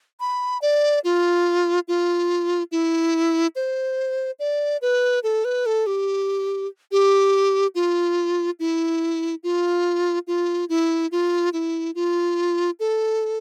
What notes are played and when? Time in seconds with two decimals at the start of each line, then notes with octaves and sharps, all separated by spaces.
0.20 B5
0.62 D5
1.04 F4
1.88 F4
2.72 E4
3.56 C5
4.39 D5
4.82 B4
5.23 A4
5.45 B4
5.66 A4
5.87 G4
6.92 G4
7.75 F4
8.60 E4
9.43 F4
10.27 F4
10.69 E4
11.12 F4
11.53 E4
11.95 F4
12.80 A4